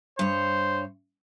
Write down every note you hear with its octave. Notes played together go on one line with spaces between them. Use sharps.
G2 C5 C#5